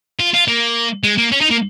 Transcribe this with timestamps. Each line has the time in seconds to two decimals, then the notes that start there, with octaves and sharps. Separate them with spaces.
0.20 F4
0.34 F4
0.48 A#3
1.03 G#3
1.18 A#3
1.32 C#4
1.41 D#4
1.51 A#3